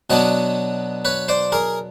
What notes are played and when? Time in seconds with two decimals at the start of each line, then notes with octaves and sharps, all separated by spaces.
0.10 B2 F#3 B3 D4 C#5 D#5
1.05 B4 C#5
1.28 C5 D5
1.52 G#4 A#4